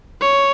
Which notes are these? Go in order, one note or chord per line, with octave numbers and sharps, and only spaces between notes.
C#5